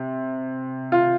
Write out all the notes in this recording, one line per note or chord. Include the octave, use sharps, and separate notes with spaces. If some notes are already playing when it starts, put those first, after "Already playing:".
Already playing: C3
F4